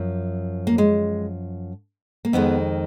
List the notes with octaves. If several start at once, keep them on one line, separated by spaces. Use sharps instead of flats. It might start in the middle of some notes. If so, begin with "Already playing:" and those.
Already playing: F#2 F3
A#3
G#3
A#3
F2 D#3 G#3 B3